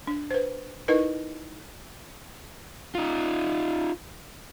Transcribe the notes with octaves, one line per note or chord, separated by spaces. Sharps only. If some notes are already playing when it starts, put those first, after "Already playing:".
D4
B4 C5
D#4 E4 A#4 B4 D#5
D#4 F4